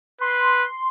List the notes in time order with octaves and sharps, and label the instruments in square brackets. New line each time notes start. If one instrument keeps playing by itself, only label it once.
[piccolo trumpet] B4 [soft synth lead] C6